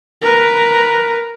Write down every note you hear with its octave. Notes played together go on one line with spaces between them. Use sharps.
A#4 B4